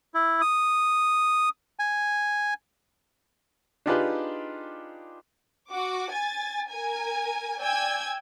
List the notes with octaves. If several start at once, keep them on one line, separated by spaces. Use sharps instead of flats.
E4
D#6
G#5
D4 D#4 F4 G4 G#4 B4
F#4 D6
G#5 A6
A#4 G#5
D5 G5 G#5 E6 G#6